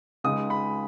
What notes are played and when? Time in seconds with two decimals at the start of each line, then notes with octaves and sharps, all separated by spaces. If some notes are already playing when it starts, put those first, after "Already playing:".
0.24 C#2 C#3 G#3 D#4 D#6
0.50 B5